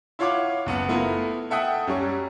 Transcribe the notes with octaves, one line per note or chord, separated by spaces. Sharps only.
E4 F4 C#5 F5 F#5 D6
F#1 B3 F#5
A3 B3 E4 F4 A#4
A4 E5 F#5 G5 D#6
F#2 G3 C#4 C#6